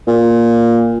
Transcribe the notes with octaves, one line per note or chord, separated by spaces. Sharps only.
A#2